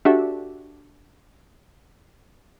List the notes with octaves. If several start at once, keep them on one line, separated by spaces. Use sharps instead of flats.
D4 F#4 G4 A4 E5